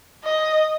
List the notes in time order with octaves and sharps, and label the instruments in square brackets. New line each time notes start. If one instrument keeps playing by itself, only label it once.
[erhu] D#5